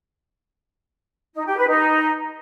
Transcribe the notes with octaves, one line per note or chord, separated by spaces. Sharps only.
D#4
G4
B4
D#4